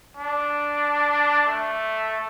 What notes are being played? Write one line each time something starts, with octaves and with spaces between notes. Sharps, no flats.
D4
A3